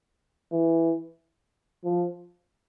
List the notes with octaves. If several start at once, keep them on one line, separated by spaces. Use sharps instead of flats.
E3
F3